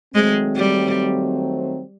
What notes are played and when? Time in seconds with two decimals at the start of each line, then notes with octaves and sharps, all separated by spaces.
0.14 D#3 F#3 G#3 A3 C4
0.56 G3